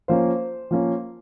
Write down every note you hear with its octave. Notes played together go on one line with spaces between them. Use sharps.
F3 A#3 C#4 C5
F3 A#3 C#4